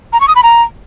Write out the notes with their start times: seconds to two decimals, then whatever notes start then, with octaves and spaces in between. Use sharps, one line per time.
0.13 A#5
0.21 C#6
0.28 D#6
0.36 B5
0.43 A#5